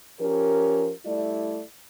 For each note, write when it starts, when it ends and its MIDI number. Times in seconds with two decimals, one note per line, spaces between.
0.19 0.91 53
0.19 0.91 61
0.19 0.91 67
0.19 0.91 70
1.05 1.62 55
1.05 1.62 57
1.05 1.62 64
1.05 1.62 74